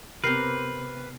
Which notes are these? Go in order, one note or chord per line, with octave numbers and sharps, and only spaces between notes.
C3 B3 C4 G4 A#4 B4 F6 C7